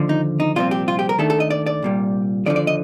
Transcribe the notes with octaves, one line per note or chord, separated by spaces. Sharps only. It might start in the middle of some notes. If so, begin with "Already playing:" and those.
Already playing: D#2 D3 F3
D#4
D#4
C2 A#2 F3 C4 F4
G4
F4
G4
A#4
D#2 D#3 A3 D4 A4
A4
D#5
D5
D5
C2 A#2 G3
D#2 D3 F3 D5
D5
D#5